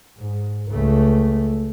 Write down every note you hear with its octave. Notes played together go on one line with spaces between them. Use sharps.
G#2
C#2 A3